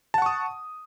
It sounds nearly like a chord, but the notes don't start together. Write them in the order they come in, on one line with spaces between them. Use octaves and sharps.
A5 F#5 C#6 D#6